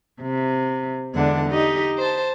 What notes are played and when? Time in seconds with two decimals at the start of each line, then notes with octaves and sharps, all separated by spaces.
0.22 C3
1.15 E2 D3 G#3 D4 F#5
1.50 D#4 G4 D#5
1.98 C5 A5